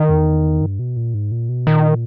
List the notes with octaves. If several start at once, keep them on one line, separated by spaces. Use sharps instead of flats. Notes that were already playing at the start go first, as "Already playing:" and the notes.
Already playing: D#3
E2
G2
B2
A#2
G#2
A#2
B2
A#2 D#3